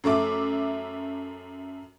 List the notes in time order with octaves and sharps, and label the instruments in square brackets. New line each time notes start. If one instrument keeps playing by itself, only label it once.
[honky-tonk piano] F#2 A3 E5 D6